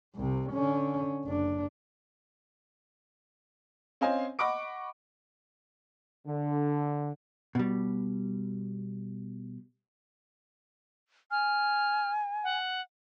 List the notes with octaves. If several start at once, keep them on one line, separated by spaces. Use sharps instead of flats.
C2 C3
D3 C#4
F#1 D4
C4 C#4 C5 D#5 F5 G#5
D#5 F#5 B5 C#6 D6 D7
D3
B2 G3
G#5 F6
F#5